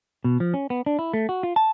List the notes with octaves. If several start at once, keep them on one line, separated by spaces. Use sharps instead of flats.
B2
F3
C#4
B3
D4
E4
A3
F#4
F4
A5